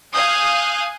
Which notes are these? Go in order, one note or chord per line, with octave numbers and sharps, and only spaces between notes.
F5 G#5 D#6 F#6 G6